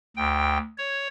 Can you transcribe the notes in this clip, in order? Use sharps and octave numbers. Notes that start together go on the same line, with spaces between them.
D2 G5
C#5